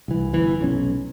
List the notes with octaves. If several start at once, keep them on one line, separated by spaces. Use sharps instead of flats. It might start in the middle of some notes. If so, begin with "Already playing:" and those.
C2 E3
G1 E3
F1 B1 C4 C#4